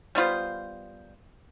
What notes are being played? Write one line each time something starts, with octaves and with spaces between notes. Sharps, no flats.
G3 B3 F4 C5